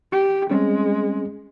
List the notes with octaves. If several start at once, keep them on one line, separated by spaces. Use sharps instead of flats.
G4
G3 G#3 C4 C#4